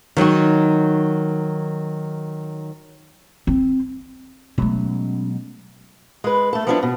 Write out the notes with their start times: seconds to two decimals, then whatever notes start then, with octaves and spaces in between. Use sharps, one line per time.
0.17 D#3 F#3 D#4 F#4
3.47 C4
4.58 B2 F#3 G#3 A3 C#4
6.24 G#3 B4
6.53 A3 A4
6.67 F3 G3 B3 C#4 D4 E4
6.83 B2